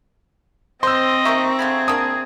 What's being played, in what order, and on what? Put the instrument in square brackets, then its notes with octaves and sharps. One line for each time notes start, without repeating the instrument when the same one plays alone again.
[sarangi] C4 [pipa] C5 [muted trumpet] D#5 [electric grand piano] C6 E6
[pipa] C3 D#3 A#3 [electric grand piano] E5 A#5 C#6
[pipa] D3 F5 B5 [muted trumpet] G#4
[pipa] A#3 D4 [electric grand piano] D#6